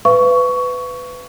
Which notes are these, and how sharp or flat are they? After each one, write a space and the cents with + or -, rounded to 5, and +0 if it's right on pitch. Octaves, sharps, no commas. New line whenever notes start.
B4 +20 F5 -40 C#6 +15